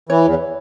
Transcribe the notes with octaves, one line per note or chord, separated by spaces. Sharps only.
E3 C#5
E2